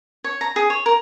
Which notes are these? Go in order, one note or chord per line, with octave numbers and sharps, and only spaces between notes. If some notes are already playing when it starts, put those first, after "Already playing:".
C#5
A#5
G#4
C#5
A#4